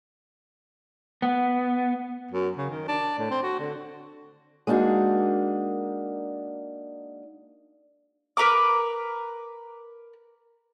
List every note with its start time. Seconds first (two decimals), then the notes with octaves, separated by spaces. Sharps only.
1.22 B3
2.31 F#2
2.57 C#3
2.70 D#3
2.88 D4
3.19 A2
3.30 C4
3.43 F#4
3.59 D3
4.67 G#3 A#3 D4 D#4 F#4
8.37 A#4 B4 A#5 D6